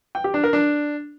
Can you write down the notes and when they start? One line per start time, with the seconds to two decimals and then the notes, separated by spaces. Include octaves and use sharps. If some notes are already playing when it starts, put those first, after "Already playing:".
0.15 G5
0.24 G4
0.34 D4
0.43 A#4
0.53 D4